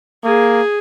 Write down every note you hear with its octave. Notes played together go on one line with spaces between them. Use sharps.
A#3 G#4